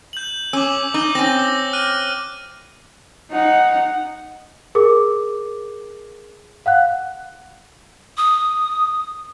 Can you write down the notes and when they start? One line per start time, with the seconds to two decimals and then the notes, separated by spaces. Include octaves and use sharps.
0.13 G6 F#7
0.53 C#4 D6 E6
0.94 D#4 G6 G7
1.15 C4 C#4 A#6
1.39 E6
1.73 F6 F#6 D#7
3.30 D#4 F#5
4.75 G#4 A#4 D6
6.66 F5 F#5 F#6
8.17 D#6